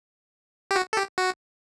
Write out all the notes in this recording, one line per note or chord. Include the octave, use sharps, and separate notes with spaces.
G4
F#4
A4
G4
F#4